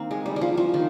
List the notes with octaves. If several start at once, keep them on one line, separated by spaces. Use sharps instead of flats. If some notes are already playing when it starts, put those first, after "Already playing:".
Already playing: D#3 A#3 C4
G#3
G3
G3
F3
F3
D#3